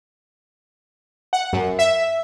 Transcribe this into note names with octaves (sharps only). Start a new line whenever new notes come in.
F#5
F#2
E5